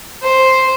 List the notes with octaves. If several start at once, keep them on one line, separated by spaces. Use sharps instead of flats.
C5